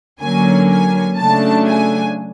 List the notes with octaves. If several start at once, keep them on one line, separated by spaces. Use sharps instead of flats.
D3 F#3 A#3 C#4 G#5
G#5
C#3 F#3 A3 D4 A5
G#5